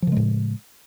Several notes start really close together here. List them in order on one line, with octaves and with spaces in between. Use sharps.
F3 C#3 G#3 A2